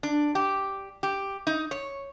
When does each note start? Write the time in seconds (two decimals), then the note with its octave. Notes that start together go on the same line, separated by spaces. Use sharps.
0.03 D4
0.35 G4
1.03 G4
1.47 D#4
1.71 C#5